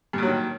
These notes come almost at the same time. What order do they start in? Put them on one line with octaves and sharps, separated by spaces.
G2 A#2 F#3 D#3